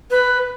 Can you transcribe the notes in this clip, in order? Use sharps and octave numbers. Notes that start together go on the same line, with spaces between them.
B4